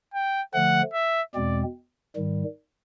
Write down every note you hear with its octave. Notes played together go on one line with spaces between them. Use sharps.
G5
D3 F3 A3 F#5
E5
E2 B2 G#3 C4 D5
G#2 D#3 G3